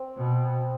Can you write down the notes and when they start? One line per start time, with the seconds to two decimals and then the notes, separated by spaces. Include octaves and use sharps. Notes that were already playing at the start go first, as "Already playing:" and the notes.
Already playing: C4
0.18 B2